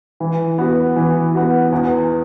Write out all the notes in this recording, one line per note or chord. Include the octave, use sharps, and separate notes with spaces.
E3
B3 F#4
E3
B3 F#4
E2